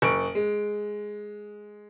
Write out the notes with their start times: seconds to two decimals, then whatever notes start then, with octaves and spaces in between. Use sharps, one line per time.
0.02 F#1 C#6 D7
0.35 G#3